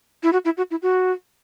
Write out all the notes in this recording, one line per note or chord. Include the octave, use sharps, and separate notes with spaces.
E4
F#4
E4
F#4
E4
F#4